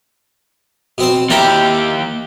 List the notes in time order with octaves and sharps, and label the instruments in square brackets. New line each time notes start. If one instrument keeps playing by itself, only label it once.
[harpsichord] B2 C4 C5
[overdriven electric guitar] D#2 G4 [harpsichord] E4 A#4 G5